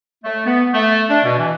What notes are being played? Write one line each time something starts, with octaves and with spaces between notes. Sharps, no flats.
A3
B3
A3
D4
B2
E3